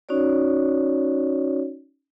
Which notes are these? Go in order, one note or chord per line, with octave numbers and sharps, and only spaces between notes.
C#4 D#4 F#4 C#5 D5